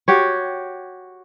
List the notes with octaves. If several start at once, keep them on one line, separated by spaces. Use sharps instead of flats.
F#4 G4 C#5